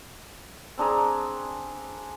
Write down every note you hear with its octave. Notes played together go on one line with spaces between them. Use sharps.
C4 D4 G#4 A#5